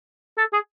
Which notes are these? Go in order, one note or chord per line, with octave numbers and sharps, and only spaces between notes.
A4
G#4